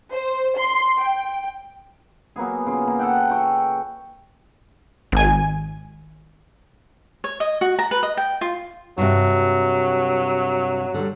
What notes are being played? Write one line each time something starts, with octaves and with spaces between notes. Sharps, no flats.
C5
C6
G5
F#3 A#3 B3 G#4
C#3 F4
A#3
A4 F#5 G5
G5 C#6
G#1 G#5
C#5
D#5
F#4
A#5
B4
D#5
G5
F4
G2 C3 F#3
D3 G3